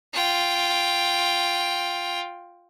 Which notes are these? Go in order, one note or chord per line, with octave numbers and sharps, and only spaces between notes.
F4 G5